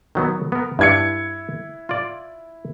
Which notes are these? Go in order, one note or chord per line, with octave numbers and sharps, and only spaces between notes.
D#3 F#3 B3
B3 A#4
G2 E4 D5 G#6 C#7
F4 D5